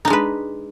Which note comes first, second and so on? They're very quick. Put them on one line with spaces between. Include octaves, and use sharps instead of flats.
D#4 D4 G#3 B4